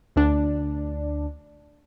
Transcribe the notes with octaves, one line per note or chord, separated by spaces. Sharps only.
D2 D4